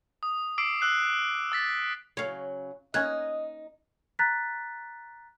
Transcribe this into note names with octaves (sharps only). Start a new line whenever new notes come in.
D#6
D6 E6 C7 D7
E6 F#6 C7
E6 A6 B6
C#3 F#3 C#5 F5
A#3 C#4 D#4 D#5 F#6 G#6
A#5 F#6 A6 B6